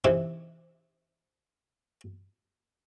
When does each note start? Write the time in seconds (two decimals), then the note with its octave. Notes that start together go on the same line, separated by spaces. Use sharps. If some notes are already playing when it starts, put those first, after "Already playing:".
0.04 C3 D#3 E3 C4